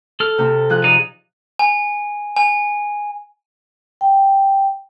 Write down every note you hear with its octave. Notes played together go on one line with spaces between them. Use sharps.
A4 F6
C3 C4
F3 G#4 F#6
D#4 D5
G#5
G#5
G5